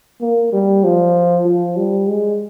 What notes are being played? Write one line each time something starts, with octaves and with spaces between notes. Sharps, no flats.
A#3
G3
F3
F3
G3
G#3